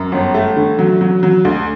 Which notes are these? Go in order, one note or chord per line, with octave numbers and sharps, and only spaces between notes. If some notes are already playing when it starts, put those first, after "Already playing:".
Already playing: F#2
G1
A3
D3
F#3
F#3
F#3
D2